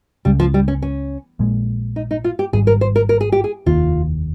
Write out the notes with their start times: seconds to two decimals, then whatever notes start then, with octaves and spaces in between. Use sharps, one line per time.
0.25 C#2 C#3 G3 G#3
0.40 F3
0.54 G3
0.68 C#4
0.82 C#4
1.39 A#1 A#2 G#3
1.96 D#4
2.11 D#4
2.24 F4
2.39 G4
2.53 G#1 G#2 G3 G#4
2.67 A#4
2.81 C5
2.96 A#4
3.09 A#4
3.21 G#4
3.32 G4
3.44 G#4
3.66 F1 D#2 D#3 A#3 F4